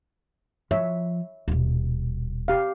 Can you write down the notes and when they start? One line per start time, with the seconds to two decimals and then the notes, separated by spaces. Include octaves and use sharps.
0.71 F3 C#5 E5
1.48 D#1 B2
2.48 G4 F5